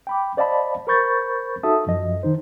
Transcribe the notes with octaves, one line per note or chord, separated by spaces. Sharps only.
G5 B5 D6
C5 D5 D#5 F5 A5 B5
A#4 C5 B5 C#6 G6 A6
D#4 F#4 A4 E5 A5 D#6
F#2 F3 D#5
D#3 D#4 C5